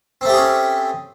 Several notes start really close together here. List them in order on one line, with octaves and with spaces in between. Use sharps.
C4 A3 G4 G#4 C#4